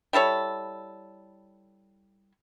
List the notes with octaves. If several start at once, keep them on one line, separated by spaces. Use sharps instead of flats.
G3 E4 A4 C#5